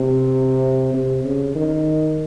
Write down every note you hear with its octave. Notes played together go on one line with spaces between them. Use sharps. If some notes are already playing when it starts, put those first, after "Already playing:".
Already playing: C3
C3
C#3
D#3